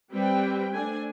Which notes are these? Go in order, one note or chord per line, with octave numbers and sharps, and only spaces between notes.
G3 C4 B4 G5
A3 D4 C5 G#5